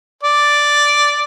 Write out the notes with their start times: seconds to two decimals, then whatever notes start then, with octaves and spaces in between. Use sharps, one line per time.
0.23 D5